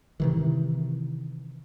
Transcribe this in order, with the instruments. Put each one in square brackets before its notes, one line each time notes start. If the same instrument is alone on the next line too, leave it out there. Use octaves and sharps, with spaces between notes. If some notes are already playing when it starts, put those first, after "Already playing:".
[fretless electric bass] C3 D#3 E3